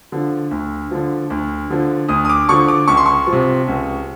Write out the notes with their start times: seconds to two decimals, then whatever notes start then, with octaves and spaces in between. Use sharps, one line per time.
0.12 D3 F3
0.51 D2
0.91 D3 F3
1.30 D2
1.70 D3 F3
2.09 D2 D#6
2.25 D#6
2.29 D6
2.49 D3 F3 C#6
2.68 D6
2.88 C#2 C#6
2.97 C6
3.06 C#6
3.27 F3
3.33 C3
3.68 C#2